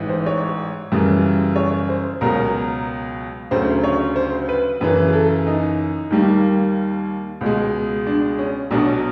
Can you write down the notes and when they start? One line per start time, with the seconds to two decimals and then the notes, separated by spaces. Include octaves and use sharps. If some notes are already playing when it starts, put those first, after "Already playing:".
Already playing: A1 G#2 E3
0.09 C5
0.26 C#5
0.92 F#2 C#3 E3 G3
1.56 C#5
1.89 C5
2.21 C#2 B2 F#3 A#4
3.51 D2 C#3 F#3 C5
3.84 C#5
4.16 C5
4.49 B4
4.81 F#2 C#3 E3 B4
5.05 G#4
5.13 A4
5.47 D#4
6.10 D#2 D#3 G3 A#3
7.41 C#2 B2 G#3
8.07 D4
8.39 C#4
8.71 B1 B2 F#3 D4